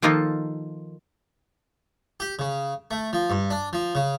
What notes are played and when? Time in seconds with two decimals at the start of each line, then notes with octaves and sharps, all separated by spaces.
0.02 D#3 F3 A#3 D#4 F4 A4
2.20 G4
2.39 C#3
2.91 A3
3.13 F3
3.30 G2
3.51 D4
3.73 F3
3.95 C#3